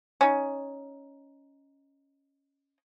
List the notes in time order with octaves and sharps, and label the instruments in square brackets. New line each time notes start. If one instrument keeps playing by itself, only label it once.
[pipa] C#4 D#4